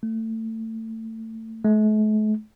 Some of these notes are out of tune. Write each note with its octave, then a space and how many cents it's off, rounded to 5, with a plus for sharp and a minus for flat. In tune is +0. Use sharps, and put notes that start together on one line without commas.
A3 +25
A3 -45